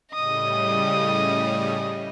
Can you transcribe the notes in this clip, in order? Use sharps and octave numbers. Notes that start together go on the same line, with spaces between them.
A2 C#3 G3 D#5 D#6